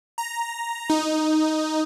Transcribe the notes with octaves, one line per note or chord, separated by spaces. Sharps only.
A#5
D#4